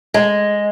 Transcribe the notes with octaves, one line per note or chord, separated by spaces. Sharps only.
G#3